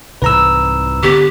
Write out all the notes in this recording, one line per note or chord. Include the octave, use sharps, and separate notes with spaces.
C2 G#2 E3 B4 A#5 E6
D3 B3 G4